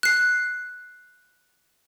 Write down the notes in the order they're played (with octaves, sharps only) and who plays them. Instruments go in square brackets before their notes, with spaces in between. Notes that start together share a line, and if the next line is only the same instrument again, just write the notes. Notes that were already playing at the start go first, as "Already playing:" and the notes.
[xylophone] F#6 C7